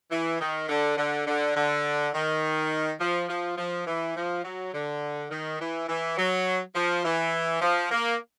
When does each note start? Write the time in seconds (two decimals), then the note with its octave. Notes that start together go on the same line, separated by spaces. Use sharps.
0.11 E3
0.41 D#3
0.69 D3
0.98 D3
1.27 D3
1.56 D3
2.14 D#3
3.00 F3
3.29 F3
3.58 F3
3.87 E3
4.16 F3
4.44 F#3
4.74 D3
5.31 D#3
5.60 E3
5.89 E3
6.17 F#3
6.75 F3
7.05 E3
7.62 F3
7.91 A#3